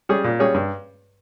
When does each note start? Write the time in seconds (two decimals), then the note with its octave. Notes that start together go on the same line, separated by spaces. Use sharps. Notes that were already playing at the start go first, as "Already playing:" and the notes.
0.09 G3 C#4 G#4 C#5
0.24 A#2
0.39 G3 C#4 G#4 C#5
0.54 G2